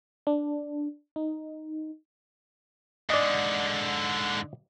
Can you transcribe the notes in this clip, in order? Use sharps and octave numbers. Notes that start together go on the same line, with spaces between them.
D4
D#4
G#2 D3 D5 D#5